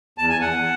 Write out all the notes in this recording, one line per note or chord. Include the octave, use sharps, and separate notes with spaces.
E2 A5
G#5
E2
F#5